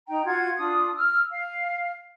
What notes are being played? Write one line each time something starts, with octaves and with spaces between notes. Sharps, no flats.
D#4 G5 A#5
F4 F#4 F#5 G#6
D4 F4 D#6
E6 F6
F5